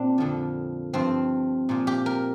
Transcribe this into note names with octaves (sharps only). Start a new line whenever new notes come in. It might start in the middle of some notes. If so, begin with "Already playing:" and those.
Already playing: A#2 C4 D4
F2 D3 F3
G2 F3 C4
A#2 F3
G4
A#4